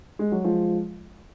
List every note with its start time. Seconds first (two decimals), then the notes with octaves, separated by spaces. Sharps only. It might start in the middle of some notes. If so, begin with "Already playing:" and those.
0.19 G#3
0.32 F#3
0.44 F3 G#3